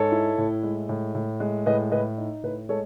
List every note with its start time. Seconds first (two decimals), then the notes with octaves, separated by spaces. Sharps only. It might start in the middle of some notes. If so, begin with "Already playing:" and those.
Already playing: G#2 A4 C#5
0.12 E4
0.38 A2
0.63 G#3
0.89 A2
1.14 A2
1.40 G#3
1.66 A2 B4 D#5
1.92 A2 B4 D#5
2.18 D#4
2.43 A2 B4
2.69 G#3 A4 C#5